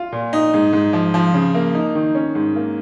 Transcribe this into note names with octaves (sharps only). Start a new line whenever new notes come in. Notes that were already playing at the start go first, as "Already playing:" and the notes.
Already playing: F4
A#2
D#4
G#2
G#2
F3
F3
C#3
A#3
D#4
D#3
C#4
G#2
A#3